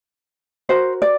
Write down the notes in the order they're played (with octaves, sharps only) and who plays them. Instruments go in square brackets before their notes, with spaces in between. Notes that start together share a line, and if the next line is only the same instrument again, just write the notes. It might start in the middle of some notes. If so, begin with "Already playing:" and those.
[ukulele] F#4 A#4 C5
D5